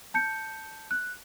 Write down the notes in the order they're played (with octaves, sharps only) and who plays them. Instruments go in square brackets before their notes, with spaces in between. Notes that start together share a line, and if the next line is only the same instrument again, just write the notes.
[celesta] A5 G6 C#7
F#6